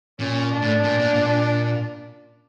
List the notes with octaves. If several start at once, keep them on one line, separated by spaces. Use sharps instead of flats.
A#2 C#4
D4
A2
A#2 D4
A#2
A#2